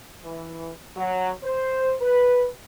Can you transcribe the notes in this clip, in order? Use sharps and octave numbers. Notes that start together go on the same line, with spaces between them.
E3
F#3
C5
B4